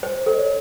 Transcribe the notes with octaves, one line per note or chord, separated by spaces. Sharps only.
C5
C5
A4 D#5
C#5